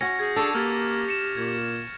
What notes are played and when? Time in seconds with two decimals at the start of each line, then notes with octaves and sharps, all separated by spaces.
0.01 C#4 F#4 G#6 A#6 C#7
0.19 G#4 G6 G#6
0.36 D4 A4 C#6 E7 F7
0.55 A#3 G4 F6 G#6 A6
1.07 A#6 C#7 E7
1.37 A#2 G#6